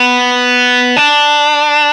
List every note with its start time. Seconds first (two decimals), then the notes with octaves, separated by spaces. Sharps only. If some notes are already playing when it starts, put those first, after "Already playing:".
Already playing: B3
0.97 D4